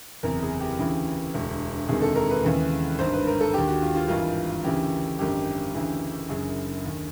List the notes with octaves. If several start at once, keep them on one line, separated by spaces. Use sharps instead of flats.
F#1 E2 C3 A#4
G#4
G4
D2 C#3 E3
E1 D2 D3
E1 D2 C3 D#3 G#4
A4
A#4
B4
D#2 C#3 E3
G#1 G2 D3 C5
B4
A#4
A4
D#2 D3 G4
F#4
F4
F4
G#1 G2 E3 F4
D2 C#3 E3 G4
G#1 F#2 D3 G4
D2 C#3 E3
F#1 F#2 D3 G#4
D#2 D3